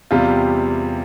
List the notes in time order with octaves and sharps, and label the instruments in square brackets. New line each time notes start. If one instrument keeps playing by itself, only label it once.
[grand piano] E2 C3 G3 F4